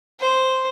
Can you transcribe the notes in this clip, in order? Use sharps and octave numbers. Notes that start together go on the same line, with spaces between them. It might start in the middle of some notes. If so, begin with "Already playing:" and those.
C5